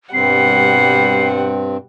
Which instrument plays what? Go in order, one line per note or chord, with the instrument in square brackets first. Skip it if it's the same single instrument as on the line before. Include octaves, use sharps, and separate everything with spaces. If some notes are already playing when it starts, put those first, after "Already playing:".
[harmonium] G2 C4 [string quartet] B2 G3 F#5 [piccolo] C7